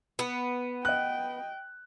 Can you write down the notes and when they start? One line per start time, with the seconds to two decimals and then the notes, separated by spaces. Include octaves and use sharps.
0.19 B3
0.85 D#5 G5 F#6